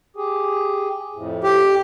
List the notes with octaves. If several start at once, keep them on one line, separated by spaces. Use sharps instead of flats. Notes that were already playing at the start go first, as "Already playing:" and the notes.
G4 G#4
F2 A2
G4